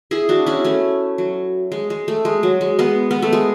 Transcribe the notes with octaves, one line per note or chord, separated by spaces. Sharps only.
E4 G#4
D4 F#4
C#4 E4
A3 C#4
F#3
G#3
G#3
A3
G#3
F#3
G#3
G#3 B3
B3
A3
G#3